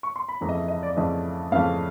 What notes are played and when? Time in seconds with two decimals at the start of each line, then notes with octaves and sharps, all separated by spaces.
0.03 C#6
0.16 C6
0.29 B5
0.41 F2 C#3 E3 A3 A#5
0.49 D#5
0.55 E5
0.68 D#5
0.83 D5
0.96 F2 C#3 E3 A3 D#5
1.52 F2 C#3 E3 A3 F5